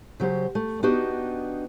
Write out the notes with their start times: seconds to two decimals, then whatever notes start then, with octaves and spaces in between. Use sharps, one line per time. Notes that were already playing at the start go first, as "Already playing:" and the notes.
0.20 C#3 F#3 G4 C5
0.55 A3
0.83 B3 D4 D#4 F#4 G4